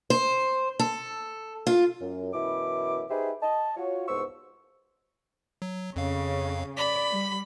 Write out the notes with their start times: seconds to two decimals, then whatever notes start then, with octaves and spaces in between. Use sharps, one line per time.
0.10 C5
0.79 A4
1.67 F4
2.01 F#2
2.33 F#2 B2 E3 E4 D6
3.10 D#4 G4 G#4 B4 C5 E5
3.42 D#5 A5
3.77 F4 F#4 C#5
4.08 C2 G#2 B3 C5 C#6 E6
5.62 F#3
5.96 F2 C#3 C#4 F5
6.77 D5 B5 B6
7.10 G3